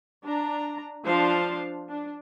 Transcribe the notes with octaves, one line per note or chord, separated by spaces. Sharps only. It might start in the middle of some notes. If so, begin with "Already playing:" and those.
D4 A#5
F3 D4 C5 F5 A5
D4